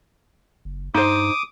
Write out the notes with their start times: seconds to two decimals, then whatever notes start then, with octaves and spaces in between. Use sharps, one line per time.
0.65 F#1
0.94 G2 D#4 C5 D6 D#6